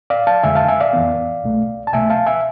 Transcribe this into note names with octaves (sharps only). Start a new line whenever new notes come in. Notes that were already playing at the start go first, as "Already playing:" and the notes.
D5 F5
F5 A5
F2 D3 G#3 E5 G#5
F5 A5
E5 G#5
D5 F5
F2 E3 B3
C2 B2 A3
A5
C2 B2 A3 E5 G#5
F5 A5
E5 G#5